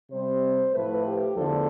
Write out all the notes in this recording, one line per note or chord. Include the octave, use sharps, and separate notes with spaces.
C3 G3 C4 C5
A2 F3 A3 B4
G4
E2 D3 F3 A3 D4 A4